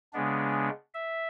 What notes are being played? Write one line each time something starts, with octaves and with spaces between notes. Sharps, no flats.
C#3 G#3 B3 D4
E5